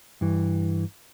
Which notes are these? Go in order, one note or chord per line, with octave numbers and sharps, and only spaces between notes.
G2 E3